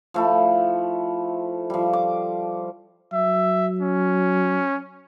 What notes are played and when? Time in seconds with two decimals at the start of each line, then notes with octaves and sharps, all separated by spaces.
0.14 F3 A3 E4
1.70 F3 G3
1.93 D6
3.13 F#3 E5
3.81 C#4